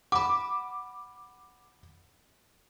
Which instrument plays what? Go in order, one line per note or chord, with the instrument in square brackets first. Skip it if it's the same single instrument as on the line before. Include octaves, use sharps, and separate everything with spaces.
[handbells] F#5 B5 [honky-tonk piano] D6